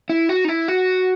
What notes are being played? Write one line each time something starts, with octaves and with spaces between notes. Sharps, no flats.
E4
F#4
D#4
E4
F#4